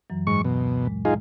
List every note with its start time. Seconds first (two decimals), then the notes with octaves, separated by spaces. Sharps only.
0.10 F#2 E3 F#3
0.27 G#2 C#6
0.45 D2 B2
0.83 A#2 G#3
1.05 G#3 D#4 F4 G#4